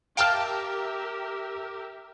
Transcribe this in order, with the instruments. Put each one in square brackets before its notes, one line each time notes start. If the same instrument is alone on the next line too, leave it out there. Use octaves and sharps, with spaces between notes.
[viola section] G4 A#4 E5 [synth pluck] F5 G5 A5 [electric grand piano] F6 D7